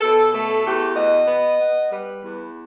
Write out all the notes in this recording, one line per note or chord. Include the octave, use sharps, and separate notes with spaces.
B2 A4
A3 A4
E2 G4
B2 D#5
B3
B3
G3 B4
E2